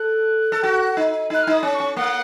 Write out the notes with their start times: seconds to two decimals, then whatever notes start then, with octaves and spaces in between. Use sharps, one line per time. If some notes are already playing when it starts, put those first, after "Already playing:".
Already playing: A4 F#6
0.52 A4
0.63 F#4
0.97 D#4
1.30 D#4 F#6
1.43 F6
1.47 D#4
1.52 D#6
1.63 C#4
1.74 C#6
1.80 C#4
1.96 A#3 F#5